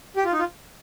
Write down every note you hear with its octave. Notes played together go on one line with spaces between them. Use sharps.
G4
F4
D#4
F4